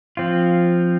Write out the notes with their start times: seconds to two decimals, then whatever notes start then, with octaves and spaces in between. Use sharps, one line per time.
0.17 F3 C4 F4